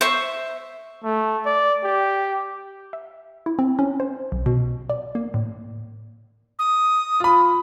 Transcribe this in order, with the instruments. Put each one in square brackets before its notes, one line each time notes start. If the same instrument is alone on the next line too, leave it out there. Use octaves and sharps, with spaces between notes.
[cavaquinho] C5 E5 C#6
[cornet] A3
D5
G4
[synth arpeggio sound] E5
E4
C4
C#4
C5
B1
B2
D5
A#3
A2
[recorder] D#6
[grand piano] F4 B5